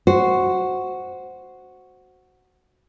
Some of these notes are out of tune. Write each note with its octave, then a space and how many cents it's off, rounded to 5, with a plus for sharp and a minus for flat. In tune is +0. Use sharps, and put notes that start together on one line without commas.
F#4 +0 C5 +0